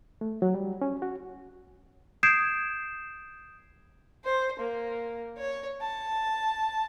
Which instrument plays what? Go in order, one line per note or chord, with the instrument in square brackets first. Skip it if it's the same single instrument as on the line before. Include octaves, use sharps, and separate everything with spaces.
[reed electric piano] A3
F#3
G3
C#4
F#4
[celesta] D#6 G6 G#6 C7 D7 E7
[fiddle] C5
A#3
C#5
A5